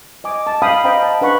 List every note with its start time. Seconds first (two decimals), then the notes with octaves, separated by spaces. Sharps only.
0.24 D#5 G#5 D6
0.47 A5
0.62 F5 G5 B5 D#6
0.84 C5 D#5 F5 G5 A#5 B5
1.03 A5
1.21 D4 B4 F#5 B5 C#6